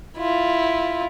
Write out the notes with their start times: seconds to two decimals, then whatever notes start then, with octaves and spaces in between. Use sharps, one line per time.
0.18 E4 F4